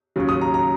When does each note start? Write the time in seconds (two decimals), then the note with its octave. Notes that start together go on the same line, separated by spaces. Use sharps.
0.16 D#2 C#3 F#3
0.29 D#6
0.41 A#5
0.54 A#5